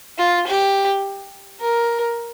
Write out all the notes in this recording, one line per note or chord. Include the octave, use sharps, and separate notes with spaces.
F4
G4
A#4